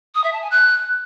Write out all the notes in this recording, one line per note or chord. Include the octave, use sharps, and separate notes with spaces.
D#6
E5
A5
G#5
F#6